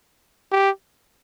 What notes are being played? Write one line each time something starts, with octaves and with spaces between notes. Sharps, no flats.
G4